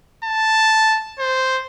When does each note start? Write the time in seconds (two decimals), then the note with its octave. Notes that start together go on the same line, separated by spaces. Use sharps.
0.25 A5
1.19 C5